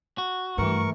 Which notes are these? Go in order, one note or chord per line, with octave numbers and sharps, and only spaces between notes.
F#4
G2 E3 A3 A#4 C#6